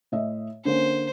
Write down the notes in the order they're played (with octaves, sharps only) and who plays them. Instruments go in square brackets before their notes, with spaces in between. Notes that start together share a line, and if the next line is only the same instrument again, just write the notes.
[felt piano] A2 D#5 E5
[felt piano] D3 A#3 C#4 [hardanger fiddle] C5